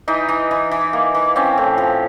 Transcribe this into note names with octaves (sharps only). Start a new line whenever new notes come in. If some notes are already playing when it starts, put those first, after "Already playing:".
E3 D#4
E3
E3
E3
A#3
E3
C4 C#4
A2
F3